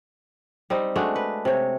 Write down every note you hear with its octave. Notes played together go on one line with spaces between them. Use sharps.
G3 C4 D#4
G#3 A3 D4 F#4
B4
C3 C#5